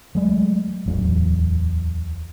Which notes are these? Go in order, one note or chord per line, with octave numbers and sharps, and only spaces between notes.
F#3 G#3 A3
D1 E2 F#3